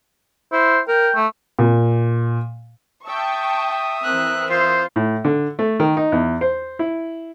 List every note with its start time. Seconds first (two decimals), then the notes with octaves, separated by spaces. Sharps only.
0.52 E4 C5
0.88 A#4 G5
1.16 A3
1.59 A#2
3.06 E5 G5 A5 C#6 D#6
4.04 E3 C4 A#4 F#6
4.50 F4 C5
4.96 A2
5.25 D3
5.59 A3
5.80 D#3
5.97 D#4
6.12 E2
6.41 C5
6.79 E4